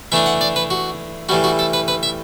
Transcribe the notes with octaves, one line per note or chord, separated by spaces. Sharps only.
E3 A3 D4 E5
F#5
D5
B4
F#4
A2 E3 G3 F#4
F#4
A4
B4
B4
E5